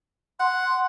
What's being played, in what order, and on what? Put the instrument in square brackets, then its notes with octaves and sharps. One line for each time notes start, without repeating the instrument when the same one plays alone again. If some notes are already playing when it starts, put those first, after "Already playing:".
[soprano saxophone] F#5 [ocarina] C6